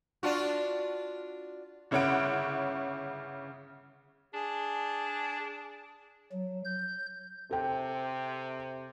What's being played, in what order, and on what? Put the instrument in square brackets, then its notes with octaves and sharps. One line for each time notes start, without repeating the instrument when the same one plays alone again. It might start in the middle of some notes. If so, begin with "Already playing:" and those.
[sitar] D4 F4 F#4
[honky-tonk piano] G1 C#3 E4 C#5 F#5 D7
[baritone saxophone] D4 [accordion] G#4
[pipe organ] F#3
G6
[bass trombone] C3 [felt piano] A4 G5